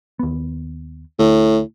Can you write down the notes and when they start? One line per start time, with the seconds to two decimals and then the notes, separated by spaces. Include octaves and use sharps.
0.19 D#2 B3
1.19 D2 A2